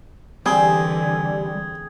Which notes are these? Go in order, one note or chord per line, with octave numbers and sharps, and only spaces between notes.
D3 E3 G3 C4 G#4